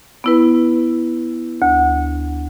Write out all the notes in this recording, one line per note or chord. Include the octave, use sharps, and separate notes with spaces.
B3 E4 B4
D2